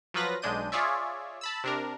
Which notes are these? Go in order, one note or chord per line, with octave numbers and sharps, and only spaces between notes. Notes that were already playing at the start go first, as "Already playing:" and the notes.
F3 F#3 F4 B4 A#6
B1 G#3 D4 G6 D#7
F4 G#4 C#5 D5 E5
A5 B5 E6
C3 D4 A#4